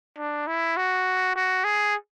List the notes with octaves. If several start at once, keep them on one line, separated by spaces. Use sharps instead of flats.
D4
E4
F#4
F#4
G#4